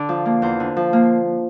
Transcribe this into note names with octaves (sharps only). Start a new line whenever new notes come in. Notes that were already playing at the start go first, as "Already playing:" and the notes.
Already playing: D3 D5
F3
A#3
E2 C5
D3
F3
A#3